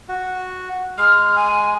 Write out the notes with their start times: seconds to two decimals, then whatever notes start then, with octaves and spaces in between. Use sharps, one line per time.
0.09 F#4
0.98 G#3 F6
1.36 G#5